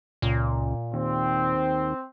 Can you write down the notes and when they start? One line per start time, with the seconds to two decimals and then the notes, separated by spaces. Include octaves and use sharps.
0.22 C#2 A#2
0.94 D#2 C4